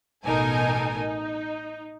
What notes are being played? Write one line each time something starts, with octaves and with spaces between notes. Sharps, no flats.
A1 B2 D#4 A4 A#4 G#5
D#4